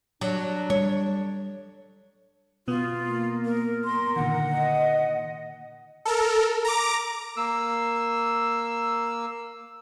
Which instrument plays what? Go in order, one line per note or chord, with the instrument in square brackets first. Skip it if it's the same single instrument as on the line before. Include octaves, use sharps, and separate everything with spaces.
[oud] F#3 [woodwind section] D4
[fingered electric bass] G3 [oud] C#5
[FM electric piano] B2 B3 D#6 [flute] F4
[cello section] A#3
[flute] A#4
[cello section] A#4 [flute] C6
[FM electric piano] A#2 D3 D#3 [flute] F#5
[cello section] D#5
[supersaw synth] A4 A#4
A#5 D6
[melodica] A#3 E6